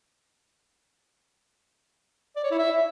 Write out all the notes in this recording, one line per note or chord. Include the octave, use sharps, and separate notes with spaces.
D5
C#5
E4
E5